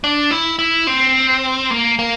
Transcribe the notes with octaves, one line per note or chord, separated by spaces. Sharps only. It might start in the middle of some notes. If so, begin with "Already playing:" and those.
D4
E4
E4
C4
A#3
A#3